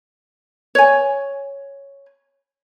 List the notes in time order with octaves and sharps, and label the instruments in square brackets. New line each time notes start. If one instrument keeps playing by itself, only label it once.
[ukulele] C#5 G#5